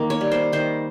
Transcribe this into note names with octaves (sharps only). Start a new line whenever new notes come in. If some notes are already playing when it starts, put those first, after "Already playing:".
Already playing: D#3 A#3
C#5
G3
C5
D#3 C5